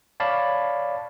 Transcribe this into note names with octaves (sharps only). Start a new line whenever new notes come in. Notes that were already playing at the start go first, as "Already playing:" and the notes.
C#5 D5 F5 A5 B5